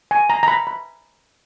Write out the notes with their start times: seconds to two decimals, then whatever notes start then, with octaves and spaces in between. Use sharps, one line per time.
0.11 G#5
0.30 A#5
0.43 A#5
0.48 B5
0.67 B5